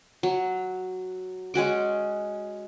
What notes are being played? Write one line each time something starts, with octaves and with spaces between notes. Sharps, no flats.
F#3
G#3 C#4 F#4 D6